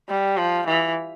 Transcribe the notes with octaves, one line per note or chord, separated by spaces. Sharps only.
G3
F3
E3